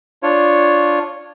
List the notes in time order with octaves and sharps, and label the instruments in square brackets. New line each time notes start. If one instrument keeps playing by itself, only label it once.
[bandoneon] D4 F4 C#5